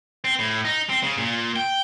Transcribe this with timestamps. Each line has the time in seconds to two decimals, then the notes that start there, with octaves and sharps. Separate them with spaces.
0.24 C4
0.39 A2
0.65 D#4
0.89 C4
1.03 C#3
1.18 A#2
1.56 G5